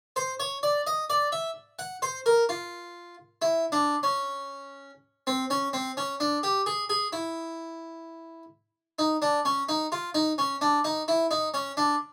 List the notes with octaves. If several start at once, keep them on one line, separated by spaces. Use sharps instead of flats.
C5
C#5
D5
D#5
D5
E5
F#5
C5
A#4
F4
E4
D4
C#4
C4
C#4
C4
C#4
D4
G4
G#4
G#4
E4
D#4
D4
C#4
D#4
F4
D#4
C#4
D4
D#4
E4
D#4
C#4
D4